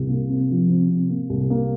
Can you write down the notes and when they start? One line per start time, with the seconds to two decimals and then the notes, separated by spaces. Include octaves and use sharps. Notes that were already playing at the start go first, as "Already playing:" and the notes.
Already playing: C2
0.09 A#3
0.29 C3
0.50 F3
0.69 C3
0.89 C3
1.10 A#3
1.30 C2
1.50 A#3